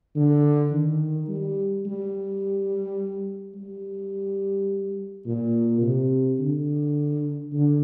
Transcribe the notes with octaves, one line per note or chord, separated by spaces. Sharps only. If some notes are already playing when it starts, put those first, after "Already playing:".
D3
D#3
G3
G3
G3
A#2
C3
D3
D3